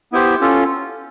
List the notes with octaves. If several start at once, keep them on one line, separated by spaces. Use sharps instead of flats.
B3 E4 G4 C5
C#4 F4 A4